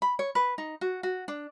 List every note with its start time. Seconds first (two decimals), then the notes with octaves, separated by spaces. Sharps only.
0.02 B5
0.19 C#5
0.35 B4
0.58 D#4
0.81 F#4
1.03 F#4
1.28 D4